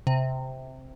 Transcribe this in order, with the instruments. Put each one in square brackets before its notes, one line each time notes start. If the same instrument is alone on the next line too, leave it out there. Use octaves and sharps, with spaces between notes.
[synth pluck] C3